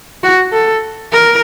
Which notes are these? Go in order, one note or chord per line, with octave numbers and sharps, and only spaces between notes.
F#4
A4
A#4